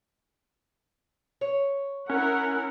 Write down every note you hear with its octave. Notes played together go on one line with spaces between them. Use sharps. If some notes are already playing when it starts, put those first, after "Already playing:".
C#5
C#4 E4 A#4 F#5